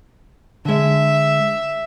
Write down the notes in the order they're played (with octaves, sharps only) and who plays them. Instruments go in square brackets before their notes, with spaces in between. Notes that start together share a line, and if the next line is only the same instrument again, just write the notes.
[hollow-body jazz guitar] D3 G#3 [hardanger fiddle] E5